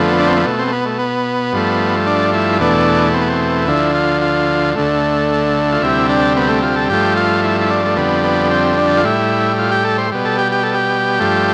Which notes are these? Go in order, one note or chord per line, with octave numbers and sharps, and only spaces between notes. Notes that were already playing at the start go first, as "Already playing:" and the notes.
Already playing: F2 D3 F3 A3 B3
D4
C4
B3
B2 A3
C4
A3
B3
A3
B3
G2 F3 A3
D4
E4
E2 B2 A3 D4
C4
B3
C4
D2 D3 F3 E4
F4
F4
D2 D3 A3
F4
D2 C3 G3 E4
D4
B3
A3
F4
A4
G2 F3 A3 G4
F4
E4
E4
D4
A3
F2 D3 G3 B3
B3
C4
D4
F4
A2 G3 E4
F4
G4
A4
C5
B2 G3
A4
G4
G4
A4
G4
G2 F3 A3